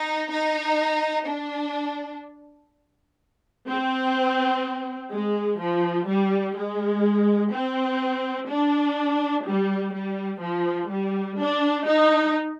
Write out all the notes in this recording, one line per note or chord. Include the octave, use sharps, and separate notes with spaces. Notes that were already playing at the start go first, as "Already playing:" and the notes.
Already playing: D#4
D#4
D4
C4
G#3
F3
G3
G#3
C4
D4
G3
G3
F3
G3
D4
D#4